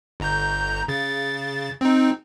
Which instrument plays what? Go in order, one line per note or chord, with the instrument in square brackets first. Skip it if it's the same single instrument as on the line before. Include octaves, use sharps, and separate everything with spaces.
[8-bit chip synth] G1 A#5 G6
C#3 A6
C4 D#4